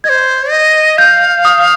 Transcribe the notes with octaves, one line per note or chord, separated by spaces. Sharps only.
D#5 G#6
C5
D#5
F5 G6
D#6